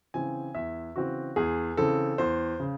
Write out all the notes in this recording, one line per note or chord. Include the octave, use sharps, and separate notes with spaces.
C#3 E3 C4 G#5
E2 E5
C#3 E3 C4 F#4
E2 G#4
C#3 E3 C4 A4
E2 C5
C#3